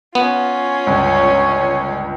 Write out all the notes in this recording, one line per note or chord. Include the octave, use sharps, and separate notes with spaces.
B3 C#4 F4
G1 C#2 C#5